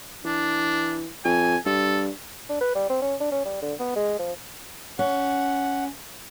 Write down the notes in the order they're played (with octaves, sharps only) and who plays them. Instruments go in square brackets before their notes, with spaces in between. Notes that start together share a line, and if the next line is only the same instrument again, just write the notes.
[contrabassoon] E3 [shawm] D4
[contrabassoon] F2 [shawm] G#5
[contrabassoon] G2 [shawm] A4
[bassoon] D4
B4
G3
C4
C#4
D4
C#4
G3
D3
B3
G#3
F3
[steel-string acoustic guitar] C#4 [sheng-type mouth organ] F#5